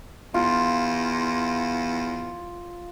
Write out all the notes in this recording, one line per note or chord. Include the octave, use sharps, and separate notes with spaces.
E2 F4